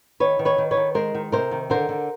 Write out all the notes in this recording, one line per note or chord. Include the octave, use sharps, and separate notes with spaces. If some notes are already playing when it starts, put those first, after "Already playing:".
D#3 B4 C#5
D#3
B4 C#5
D#3
B4 C#5
D#3
G#3 A#4 C5
D#3
C3 A#4 C5
D#3
D3 A#4 C5
D3